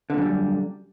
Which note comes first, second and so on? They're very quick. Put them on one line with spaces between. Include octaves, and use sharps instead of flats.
D3 A#2 F#2 G3